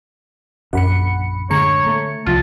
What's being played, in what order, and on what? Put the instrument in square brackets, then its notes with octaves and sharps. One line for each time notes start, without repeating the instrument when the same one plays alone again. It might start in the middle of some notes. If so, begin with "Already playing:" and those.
[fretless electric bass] A#1 [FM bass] F#2 [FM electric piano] F#5 B5 C#7
[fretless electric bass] A2 G#3 [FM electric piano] D3 A#5 C#7 [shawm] C#5
[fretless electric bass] A3
[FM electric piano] C2 F3 [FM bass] F4 [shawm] A5